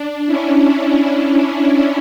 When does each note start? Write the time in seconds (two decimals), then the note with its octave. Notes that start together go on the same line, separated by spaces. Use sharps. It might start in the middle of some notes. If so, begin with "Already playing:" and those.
Already playing: D4
0.26 C#4 E4